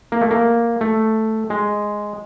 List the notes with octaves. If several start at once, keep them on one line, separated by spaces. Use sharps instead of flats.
A#3
A3
A#3
A3
G#3